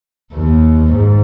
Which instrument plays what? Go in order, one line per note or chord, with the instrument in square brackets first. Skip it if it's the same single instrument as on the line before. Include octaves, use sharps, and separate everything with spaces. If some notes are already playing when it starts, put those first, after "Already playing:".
[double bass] D#2
G#2